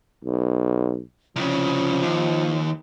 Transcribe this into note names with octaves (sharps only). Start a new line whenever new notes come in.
B1
C2 C#3 F3
D#2